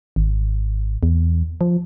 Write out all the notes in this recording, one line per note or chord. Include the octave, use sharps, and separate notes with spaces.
G#1
E2
F3